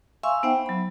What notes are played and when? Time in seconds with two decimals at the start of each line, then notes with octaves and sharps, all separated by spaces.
0.23 E5 F5 G#5 C6 C#6 E6
0.43 B3 D#4 C5 E5 F#5 G5
0.66 F#3 B5